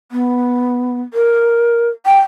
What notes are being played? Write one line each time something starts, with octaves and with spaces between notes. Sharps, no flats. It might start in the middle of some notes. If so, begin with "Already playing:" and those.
B3
A#4
G5